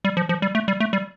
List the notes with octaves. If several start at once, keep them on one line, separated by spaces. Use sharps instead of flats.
G3
F3
F3
G3
A3
G3
A3
G3